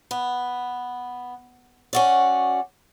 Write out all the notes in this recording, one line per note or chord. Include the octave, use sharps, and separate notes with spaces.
B3
C#4 F#4 D5